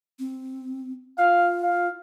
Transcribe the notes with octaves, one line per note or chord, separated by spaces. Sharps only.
C4
F4 F5
F5